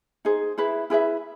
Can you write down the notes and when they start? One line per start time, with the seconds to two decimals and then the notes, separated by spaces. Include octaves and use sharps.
0.25 D#4 G#4 C5
0.58 E4 G#4 B4 E5
0.90 E4 G#4 B4 E5